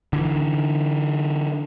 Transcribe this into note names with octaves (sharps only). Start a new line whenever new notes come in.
D3 E3